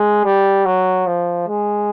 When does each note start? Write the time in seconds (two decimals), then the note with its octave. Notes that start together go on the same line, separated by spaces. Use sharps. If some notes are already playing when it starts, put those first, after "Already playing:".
Already playing: G#3
0.24 G3
0.65 F#3
1.06 F3
1.48 G#3